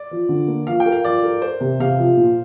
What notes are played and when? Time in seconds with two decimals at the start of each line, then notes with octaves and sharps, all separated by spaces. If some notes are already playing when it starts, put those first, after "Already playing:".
Already playing: D5
0.11 F3
0.29 D3
0.48 A#3
0.67 F3 F5
0.80 G5
0.86 A#4
0.92 F5
1.04 F3 D5
1.23 A#4
1.42 A#4 C5
1.61 C3
1.80 C3 F5
1.98 F3
2.17 A#2